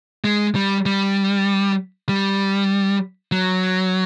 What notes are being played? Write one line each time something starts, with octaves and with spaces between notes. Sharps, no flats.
G#3
G3
G3
G3
F#3